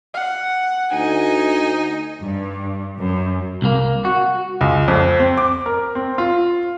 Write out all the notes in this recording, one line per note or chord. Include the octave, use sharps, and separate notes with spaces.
F#5
D2 D#4 G#5
G2
F#2
C2 A#3
F#4
C#2
F2
C4
D6
A#4
C4
F4